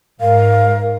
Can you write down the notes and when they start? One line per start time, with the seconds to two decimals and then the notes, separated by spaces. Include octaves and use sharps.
0.21 G#2 A#4 F5